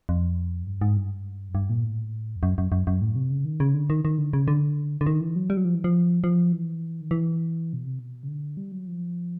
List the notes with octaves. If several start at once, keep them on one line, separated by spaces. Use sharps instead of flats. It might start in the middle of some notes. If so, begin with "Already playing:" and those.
F2
F#2
G2
G#2
G2
F#2
G2
A#2
A2
F2
F#2
F#2
F#2
F#2
A2
C3
C#3
D#3
C#3
D3
D#3
D#3
D3
C#3
D3
D3
D#3
E3
F#3
G3
F#3
F3
E3
F3
F3
E3
D#3
E3
B2
C3
B2
C#3
D3
G3
F#3
F3